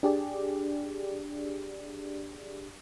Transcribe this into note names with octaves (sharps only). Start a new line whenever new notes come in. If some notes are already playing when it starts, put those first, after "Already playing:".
D4 G4 G#4 D5